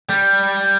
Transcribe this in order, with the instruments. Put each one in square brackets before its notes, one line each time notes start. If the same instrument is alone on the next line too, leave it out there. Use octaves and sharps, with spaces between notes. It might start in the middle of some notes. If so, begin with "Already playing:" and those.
[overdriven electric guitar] G3